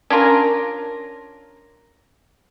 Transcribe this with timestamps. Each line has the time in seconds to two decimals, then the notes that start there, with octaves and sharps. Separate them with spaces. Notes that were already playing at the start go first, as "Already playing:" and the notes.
0.10 C#4 D4 F4 A#4